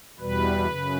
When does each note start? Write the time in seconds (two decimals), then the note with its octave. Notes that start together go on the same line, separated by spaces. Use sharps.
0.20 E2 B2 G3 B4
0.67 F#2 C#3